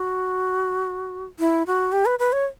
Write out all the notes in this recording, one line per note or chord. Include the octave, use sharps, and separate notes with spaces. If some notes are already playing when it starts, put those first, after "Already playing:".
Already playing: F#4
E4
F#4
G4
B4
B4
C#5